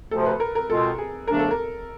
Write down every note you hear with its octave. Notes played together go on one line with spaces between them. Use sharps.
D2 C3 F3 A4
B4
A#4
A#4
B2 G#3 C4 F4 A4
G#4
E2 C#3 F3 A3 D4 A#4
A4
A#4